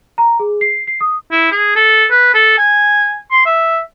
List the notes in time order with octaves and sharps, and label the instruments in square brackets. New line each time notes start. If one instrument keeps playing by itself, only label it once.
[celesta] A#5
G#4
C7
C7
D#6
[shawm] E4
G#4
A4
B4
A4
G#5
C6
E5